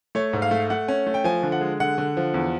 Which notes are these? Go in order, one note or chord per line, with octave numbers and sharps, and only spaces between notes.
A3 C#5
G#2
F5
A3
A3 F#5
C#4
A3
G5
F3 G#5
D3
F#5
G#3
D3 F#5
D3
F3
E2